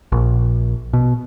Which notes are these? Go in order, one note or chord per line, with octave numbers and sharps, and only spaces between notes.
A#1
B2